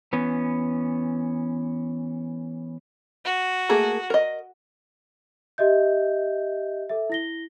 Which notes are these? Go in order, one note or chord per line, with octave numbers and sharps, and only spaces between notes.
E3 B3 C#4
F#4
A3 A#3 G#4
A#4 D#5
G4 D#5 E5 G6
A4 E5
E4 A#6 G7